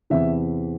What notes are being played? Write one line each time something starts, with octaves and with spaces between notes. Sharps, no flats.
E2 C3 E3 E5